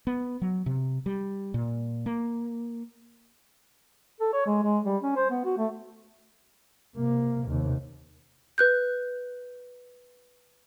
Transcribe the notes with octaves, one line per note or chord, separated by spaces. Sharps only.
B3
F#3
C3
G3
A#2
A#3
A4
C#5
G#3
G#3
G3
C#4
C5
B3
F#4
A3
C3 A#3
D#2 C3
B4 F#6 G6